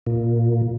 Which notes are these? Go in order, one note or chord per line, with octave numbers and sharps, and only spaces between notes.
A#2